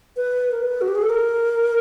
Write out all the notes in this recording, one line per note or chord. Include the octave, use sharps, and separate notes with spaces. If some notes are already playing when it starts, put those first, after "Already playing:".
B4
A#4
B4
F#4
G4
G#4
A4
A#4